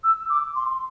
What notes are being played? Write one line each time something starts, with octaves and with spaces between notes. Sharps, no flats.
E6
D6
C6